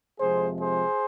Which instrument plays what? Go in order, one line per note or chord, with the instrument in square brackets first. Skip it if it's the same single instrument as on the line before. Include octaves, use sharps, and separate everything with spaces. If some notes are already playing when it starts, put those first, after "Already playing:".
[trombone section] F2 C3 F3 G#3 G#4 C5
G#4 C5